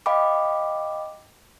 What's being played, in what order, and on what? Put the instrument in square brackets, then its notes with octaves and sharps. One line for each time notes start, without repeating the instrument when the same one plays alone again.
[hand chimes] D#5 F5 G5 B5 D6